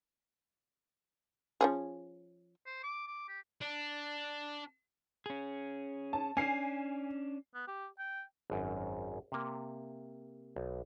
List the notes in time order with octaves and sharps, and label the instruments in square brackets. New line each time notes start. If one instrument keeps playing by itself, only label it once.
[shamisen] F3 C#4 G#4
[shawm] C5
D6
D6
G4
[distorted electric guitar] D4
[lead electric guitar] C#4 G#4
[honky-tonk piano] A5
[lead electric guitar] C#4 D4 [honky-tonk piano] G#5 C7
[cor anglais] B3
G4
G5
[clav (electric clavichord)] G#1 F#2
C3 A#3
B1